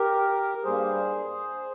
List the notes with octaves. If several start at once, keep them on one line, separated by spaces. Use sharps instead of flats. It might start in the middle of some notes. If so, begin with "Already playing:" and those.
Already playing: G4 A#4
G2 G3 A#3 G#4 C5